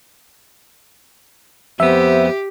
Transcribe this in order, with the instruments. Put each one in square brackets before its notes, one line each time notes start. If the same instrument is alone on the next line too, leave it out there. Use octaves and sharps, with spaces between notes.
[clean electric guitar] F2 B3 [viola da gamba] G4 [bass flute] C5 [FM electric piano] E5